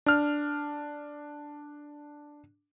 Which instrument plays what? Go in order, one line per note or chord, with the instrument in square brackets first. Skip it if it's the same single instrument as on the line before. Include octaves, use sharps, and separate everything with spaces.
[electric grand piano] D4 F6